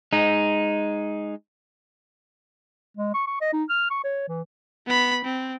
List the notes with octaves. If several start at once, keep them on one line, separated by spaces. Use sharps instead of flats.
G#3 D#4
G#3
C#6
C#6
D#5
D#4
F6
C#6
C#5
E3
B3 B5
C4